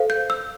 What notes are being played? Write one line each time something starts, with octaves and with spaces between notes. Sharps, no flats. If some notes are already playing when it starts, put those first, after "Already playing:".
Already playing: A4 C5 F5
G6
E6